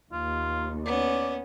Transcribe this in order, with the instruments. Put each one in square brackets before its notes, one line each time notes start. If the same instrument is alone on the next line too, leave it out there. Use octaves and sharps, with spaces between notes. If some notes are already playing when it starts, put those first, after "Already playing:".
[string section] D#2 [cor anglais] F4
[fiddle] B3 C#4 [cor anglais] D5